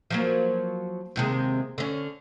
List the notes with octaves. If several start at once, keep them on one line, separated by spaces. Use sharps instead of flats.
F3 F#3 A#3
D#2 C3 G#3
D3 C#4